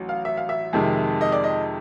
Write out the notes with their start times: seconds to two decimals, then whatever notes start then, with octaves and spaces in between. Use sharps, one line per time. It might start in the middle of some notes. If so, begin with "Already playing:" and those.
Already playing: A1 F#3
0.09 F5
0.25 E5
0.37 F5
0.49 E5
0.73 F2 C3 D#3 G#3
1.21 D#5
1.32 D5
1.44 D#5